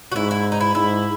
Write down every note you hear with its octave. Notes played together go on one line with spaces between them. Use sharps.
F#4
G#2 E4
E4
D#4
E4
G#2 E4